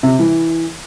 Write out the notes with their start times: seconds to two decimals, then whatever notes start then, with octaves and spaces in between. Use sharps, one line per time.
0.03 C3
0.19 E3